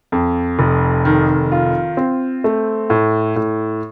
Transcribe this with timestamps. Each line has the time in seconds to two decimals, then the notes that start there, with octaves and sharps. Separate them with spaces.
0.12 F2
0.59 F1
1.05 D#3
1.52 F4
1.97 C4
2.44 A3
2.90 A2
3.36 A2